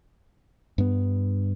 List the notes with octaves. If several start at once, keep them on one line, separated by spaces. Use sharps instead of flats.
G2 B3